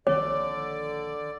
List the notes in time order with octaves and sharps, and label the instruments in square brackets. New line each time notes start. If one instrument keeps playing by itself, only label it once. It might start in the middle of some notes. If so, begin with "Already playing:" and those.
[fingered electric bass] A#1 D#3 A#3 [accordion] D3 D5 [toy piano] C#5 [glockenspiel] D6